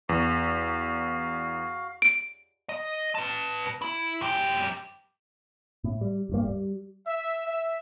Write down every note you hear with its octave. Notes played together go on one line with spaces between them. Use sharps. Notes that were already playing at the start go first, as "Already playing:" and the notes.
E2 F#4 F5
D7
D#5
B4 A5
E4
F#2 G4
A2
G3
D1 G2 A#3
G3
E5
E5